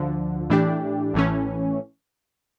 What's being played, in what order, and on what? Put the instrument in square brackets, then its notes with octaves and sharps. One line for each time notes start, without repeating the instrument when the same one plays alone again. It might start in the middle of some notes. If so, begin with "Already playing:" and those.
Already playing: [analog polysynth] D2 D3 F3
A2 E3 A3 D4 G4
A1 A2 E3 A3 C#4